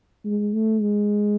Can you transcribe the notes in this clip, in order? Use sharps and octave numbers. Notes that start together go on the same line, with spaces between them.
G#3
A3
G#3